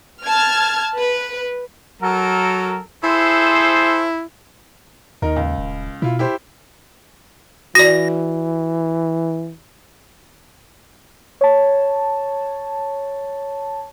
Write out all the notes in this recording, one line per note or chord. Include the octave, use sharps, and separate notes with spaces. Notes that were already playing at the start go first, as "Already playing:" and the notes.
A5 F6 G#6
B4
F#3 A4 A#4
E4 G#4 A4 C5
D#2 D#3 D#4 A#4
C#2
D#1
B2 E4 F4
E4 G4 C5
E3 F#4 D5 A#6
C#5 A5